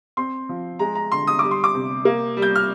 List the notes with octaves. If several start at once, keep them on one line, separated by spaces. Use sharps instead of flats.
C4 C6
F3
G#3 A#5
A#5
D3 C6
D#6
G3 D6
C6
D6
C3
A#3
G3
G6
F6